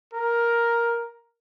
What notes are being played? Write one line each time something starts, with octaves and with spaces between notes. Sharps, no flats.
A#4